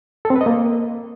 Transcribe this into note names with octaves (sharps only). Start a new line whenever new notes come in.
A4
C4
B4
D#5
A#3